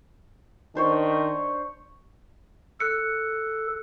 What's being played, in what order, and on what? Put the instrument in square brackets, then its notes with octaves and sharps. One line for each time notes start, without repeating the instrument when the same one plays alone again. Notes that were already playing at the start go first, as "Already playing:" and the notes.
[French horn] D#3 [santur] D4 C5 C#5
[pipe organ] A4 [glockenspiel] F#6 C#7